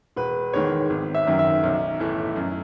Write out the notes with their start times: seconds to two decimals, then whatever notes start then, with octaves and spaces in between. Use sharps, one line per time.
0.16 E1 B4
0.53 E2 D#3 G#3 C#5
0.90 G#1
1.15 E5
1.27 F#2 D#3 F#3
1.39 E5
1.63 B1
2.00 A2 E3 A3
2.36 F#2